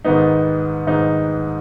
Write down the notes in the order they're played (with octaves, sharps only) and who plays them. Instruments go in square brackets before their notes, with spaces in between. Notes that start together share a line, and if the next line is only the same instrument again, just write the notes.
[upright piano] G#2 D#3 B3 D#4
G#2 D#3 B3 D#4